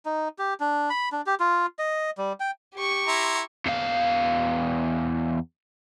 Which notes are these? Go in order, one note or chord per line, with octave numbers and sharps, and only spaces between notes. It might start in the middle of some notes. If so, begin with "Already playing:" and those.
D#4
G4
D4
B5
D4
G4
F4
D#5
G3
G5
G4 C#6
E4 A#5 C6
E2 F5